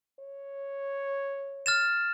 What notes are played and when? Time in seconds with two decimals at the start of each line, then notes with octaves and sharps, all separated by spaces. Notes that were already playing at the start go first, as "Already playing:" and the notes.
0.20 C#5
1.66 F6 A6 E7